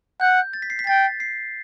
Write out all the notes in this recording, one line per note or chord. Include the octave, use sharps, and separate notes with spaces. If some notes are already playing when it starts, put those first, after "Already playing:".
F#5 G6
A6
B6
C7
B6
G5 A6
C7